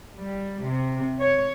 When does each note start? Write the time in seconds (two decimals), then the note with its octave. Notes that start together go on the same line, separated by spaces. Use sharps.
0.16 G3
0.66 C3
1.21 C#5